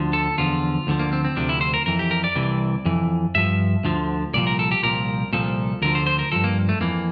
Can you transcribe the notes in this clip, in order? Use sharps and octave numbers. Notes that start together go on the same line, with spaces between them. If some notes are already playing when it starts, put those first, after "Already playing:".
Already playing: D2 D3 F3
A4
E2 D3 F3 F4
D2 D3 F3
A#3
C4
C4
D2 C3 F3 D4
E4
C5
A#4
F2 E3 A#4
G4
A#4
D5
C2 C3 E3
F2 E3
G2 F3 E5
D2 D3 F3
C2 A#2 F3 D5
A#4
A4
G4
C2 A#2 F3 A#4
C2 A#2 F3 A4
D2 D3 F3 A#4
C5
C5
A#4
G2 F3 A4
A#3
A3
F2 E3 A#3